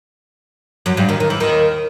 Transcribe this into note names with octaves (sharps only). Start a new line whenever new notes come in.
F#2 F#3
G2 G3
D#2 D#3
D#3
E3
D#2 D#3